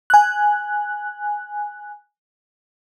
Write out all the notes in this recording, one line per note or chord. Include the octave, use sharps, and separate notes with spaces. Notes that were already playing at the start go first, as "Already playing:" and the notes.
G#5 F#6